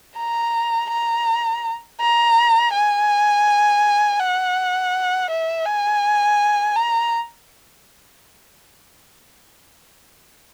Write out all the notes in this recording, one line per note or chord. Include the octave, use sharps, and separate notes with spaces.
A#5
A#5
A#5
G#5
F#5
E5
G#5
A#5